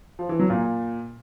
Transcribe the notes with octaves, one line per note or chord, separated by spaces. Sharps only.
F3
E3
F#3
A#2